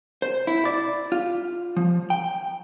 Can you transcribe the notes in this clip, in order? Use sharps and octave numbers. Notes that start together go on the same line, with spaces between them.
C5
E4
D5
F4
F3
G5